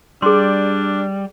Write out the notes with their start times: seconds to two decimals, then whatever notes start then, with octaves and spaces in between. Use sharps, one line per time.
0.22 G3 D4 G#4 C6